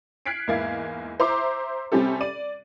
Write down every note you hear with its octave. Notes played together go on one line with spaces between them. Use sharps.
F6 F#6 G#6 B6 C7 D7
E2 G#2 A#3 E4 F5 G#6
C5 E5 A#5 C6 D6
C3 G3 C4 C#4 G4 A4
D5 D#7